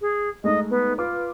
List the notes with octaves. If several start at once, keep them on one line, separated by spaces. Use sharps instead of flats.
G#4
G#3 A3 D#4 D#5
B3
F4 B4 D6